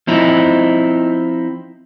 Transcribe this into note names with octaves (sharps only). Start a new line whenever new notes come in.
F3 C4 D#4 E4